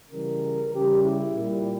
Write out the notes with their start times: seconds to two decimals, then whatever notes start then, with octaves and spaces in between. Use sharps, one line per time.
0.11 C#3 E3 G3 A#4
0.72 C#3 G3 G4
1.02 E4
1.33 A#2 G3